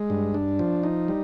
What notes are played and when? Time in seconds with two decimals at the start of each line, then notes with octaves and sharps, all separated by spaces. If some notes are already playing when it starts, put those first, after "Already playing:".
Already playing: G#3
0.10 G2
0.34 D4
0.59 F3
0.83 D#4
1.08 G3